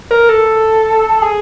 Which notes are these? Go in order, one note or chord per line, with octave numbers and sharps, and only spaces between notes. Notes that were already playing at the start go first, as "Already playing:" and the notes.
A#4
A4
G#4